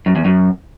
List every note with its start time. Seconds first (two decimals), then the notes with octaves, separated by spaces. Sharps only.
0.06 F#2
0.16 E2
0.25 F#2